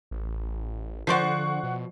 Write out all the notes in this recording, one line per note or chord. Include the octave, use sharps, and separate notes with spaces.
A1
D3 F3 C5 D5 F#5 C#6 C7
B2